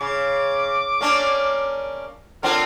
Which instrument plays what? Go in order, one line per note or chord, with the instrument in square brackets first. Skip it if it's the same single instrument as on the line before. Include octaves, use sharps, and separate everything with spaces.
[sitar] C#3 [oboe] D6
[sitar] A#3 C#4 D4
[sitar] D3 C4 F4 [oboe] A#4